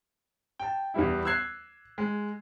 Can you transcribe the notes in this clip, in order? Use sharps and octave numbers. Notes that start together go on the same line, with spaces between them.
G5 A5
E2 E3 G3 E4
E6 F#6 G#6 C7
G#3